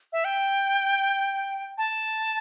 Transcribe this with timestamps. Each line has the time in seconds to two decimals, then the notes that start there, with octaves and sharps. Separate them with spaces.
0.13 E5
0.25 G5
1.78 A5